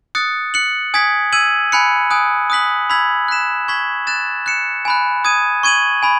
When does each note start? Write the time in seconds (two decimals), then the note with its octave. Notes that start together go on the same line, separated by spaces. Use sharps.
0.15 D#6 F#6 A6 C#7
0.54 F#6 C#7 F#7
0.94 G#5 D#6 G#6 B6
1.33 E6 G#6 D#7 F#7
1.72 G#5 B5 F#6 C#7
2.10 G#5 D#6 F#6
2.50 D#6 F#6 B6 F#7
2.90 B5 E6 G#6 B6 F#7
3.28 F#6 B6 E7
3.68 C#6 G#6 B6 F#7
4.07 F#6 A6 E7
4.46 F#6 C#7 E7
4.85 G#5 B5 F#6
5.24 D#6 G#6 D#7
5.63 C#6 G#6 D#7 F#7
6.03 G#5 B5